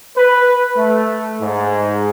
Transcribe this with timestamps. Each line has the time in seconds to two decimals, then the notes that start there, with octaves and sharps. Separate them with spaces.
0.17 B4
0.77 A3
1.41 G#2